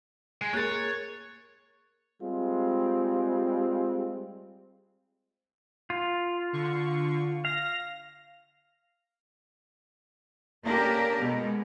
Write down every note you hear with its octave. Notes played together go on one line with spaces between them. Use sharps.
G#3
A#3 G#4 A#4 C#5 F#6 A6
G3 G#3 C4 F4
F4
D3 C#6
F5 A#6
A#3 C#4 D4 G4 A4 A#4
B2 G#3 B3